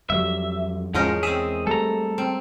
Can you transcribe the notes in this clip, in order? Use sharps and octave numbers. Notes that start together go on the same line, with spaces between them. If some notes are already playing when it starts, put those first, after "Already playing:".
F2 F#3 G3 E5
E2 G#2 F3 G#3 C#4 D#4 A#4
C4 G#4 E5
G3 A3 A4 A#5
C4